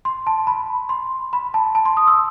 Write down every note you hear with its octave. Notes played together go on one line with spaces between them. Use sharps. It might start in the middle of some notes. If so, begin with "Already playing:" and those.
C6
A5
B5
C6
B5
A5
A5
C6
D#6
E6